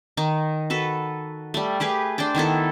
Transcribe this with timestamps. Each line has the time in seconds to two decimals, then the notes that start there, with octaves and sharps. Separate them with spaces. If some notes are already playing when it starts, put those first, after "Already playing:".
0.17 D#3 D#4
0.70 F#4 A4 B4
1.54 G3 A3
1.80 A3 G4 G#4 B4
2.18 D4 C5 D5 G5
2.35 D#3 B3 E4 A4